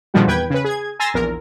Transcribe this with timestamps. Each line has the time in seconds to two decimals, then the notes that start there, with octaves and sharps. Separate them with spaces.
0.14 A#2 D3 D#3 F3 G3 F#4
0.27 E2 B4 G5 G#6
0.50 C#3 B4
0.64 G#4 G#6
1.00 G#5 A#5 C6 E6 A6 A#6
1.14 A#1 E2 A#4